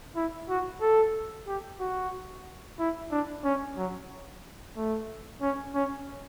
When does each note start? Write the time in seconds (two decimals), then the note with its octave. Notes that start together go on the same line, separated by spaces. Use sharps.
0.16 E4
0.49 F#4
0.81 A4
1.48 G4
1.80 F#4
2.79 E4
3.11 D4
3.44 C#4
3.77 F#3
4.76 A3
5.41 C#4
5.74 C#4